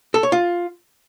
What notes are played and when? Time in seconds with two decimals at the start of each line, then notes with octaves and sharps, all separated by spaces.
0.14 A4
0.23 C#5
0.32 F4